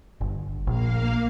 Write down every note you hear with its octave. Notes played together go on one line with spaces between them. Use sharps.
G1
A#1 A#3 F5